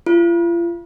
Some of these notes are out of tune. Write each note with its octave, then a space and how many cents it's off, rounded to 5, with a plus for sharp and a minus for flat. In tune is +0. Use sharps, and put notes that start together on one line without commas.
F4 -40